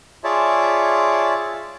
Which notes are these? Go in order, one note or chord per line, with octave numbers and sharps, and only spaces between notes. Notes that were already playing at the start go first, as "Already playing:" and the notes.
F4 G#4 C#5 D5 E5 A5